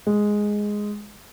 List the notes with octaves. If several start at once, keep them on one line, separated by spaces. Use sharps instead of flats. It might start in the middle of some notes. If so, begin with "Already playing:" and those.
G#3